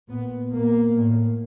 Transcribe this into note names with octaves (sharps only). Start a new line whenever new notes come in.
A#2 B3
A#2 A#3
A2